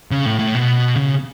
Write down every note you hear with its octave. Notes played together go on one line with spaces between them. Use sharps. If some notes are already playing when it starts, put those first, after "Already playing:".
C#3
A2
A2
B2
C#3